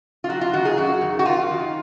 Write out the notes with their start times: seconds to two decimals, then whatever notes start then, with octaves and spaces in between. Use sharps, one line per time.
0.24 F4
0.29 F#3 F#4
0.41 F4
0.53 D#3 F#4
0.65 G#4
0.77 F#2 F#4
1.01 D#3
1.19 F#4
1.25 F#2 F4
1.50 D#3